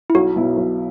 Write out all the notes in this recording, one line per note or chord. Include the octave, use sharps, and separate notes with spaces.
E4
B1 F#4
B2 F#3 B3 E4
B1